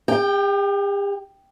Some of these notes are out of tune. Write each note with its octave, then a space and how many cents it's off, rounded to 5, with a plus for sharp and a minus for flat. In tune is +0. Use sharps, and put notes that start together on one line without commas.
G4 +45 G5 +0